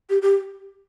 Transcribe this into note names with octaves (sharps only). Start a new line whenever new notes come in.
G4
G4